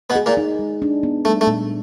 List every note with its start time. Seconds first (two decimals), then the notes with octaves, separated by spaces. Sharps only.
0.10 B2 B3
0.16 G#4
0.26 A#2 A#3
0.37 D#4
0.59 G#3
0.82 D4
1.03 B3
1.25 G3 A3
1.41 A3
1.47 A#2